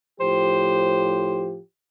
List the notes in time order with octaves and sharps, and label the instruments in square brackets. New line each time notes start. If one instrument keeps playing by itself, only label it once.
[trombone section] A2 F3 G4 [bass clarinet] C5